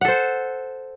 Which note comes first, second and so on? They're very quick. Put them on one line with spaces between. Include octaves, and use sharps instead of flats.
F#5 A4 C5